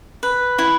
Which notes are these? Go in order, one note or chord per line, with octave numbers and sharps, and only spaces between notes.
B4
E4